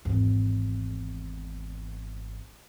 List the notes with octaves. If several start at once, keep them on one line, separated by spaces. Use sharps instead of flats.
G#1 E2